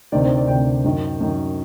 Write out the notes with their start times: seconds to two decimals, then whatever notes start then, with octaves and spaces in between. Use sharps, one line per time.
0.12 D2 C3 D#3 D5
0.24 C5
0.37 D5
0.48 D2 C3 D#3 G5
0.84 F#2 D#3
1.20 F#2 D#3